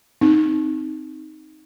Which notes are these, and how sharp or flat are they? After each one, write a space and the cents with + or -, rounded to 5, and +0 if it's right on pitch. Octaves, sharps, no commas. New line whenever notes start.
C4 +0 D#4 +0